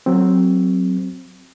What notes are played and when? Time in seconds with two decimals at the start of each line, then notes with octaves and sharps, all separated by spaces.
0.06 F#3 C4